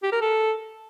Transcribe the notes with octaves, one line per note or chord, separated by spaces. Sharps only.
G4
A#4
A4